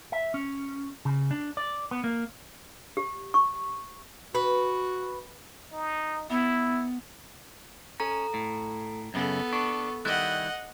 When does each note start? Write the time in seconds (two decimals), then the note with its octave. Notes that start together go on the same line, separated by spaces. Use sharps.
0.12 E5
0.34 C#4
1.05 C#3
1.31 D4
1.57 D5
1.91 B3
2.04 A#3
2.97 G4
3.34 C#6
4.35 F#4 B4
5.73 D#4
6.30 B3 E4
8.00 C#4 A4 A#5
8.34 A2
9.14 F#2 C#3 B3 A4
9.53 D4 C#6
10.05 D#3 G3 E4 D#5 F#5 F#6